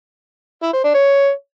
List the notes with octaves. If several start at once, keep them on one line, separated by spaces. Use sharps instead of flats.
E4
C5
D4
C#5